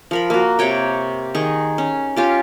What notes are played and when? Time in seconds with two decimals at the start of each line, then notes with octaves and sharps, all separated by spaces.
0.11 F3 A#4 B5
0.30 A#3 F#4
0.59 C3 A#3 C#5 G5
1.35 D#3 D#4 G#4 C#6
1.78 C#4
2.16 C#4 F4 G4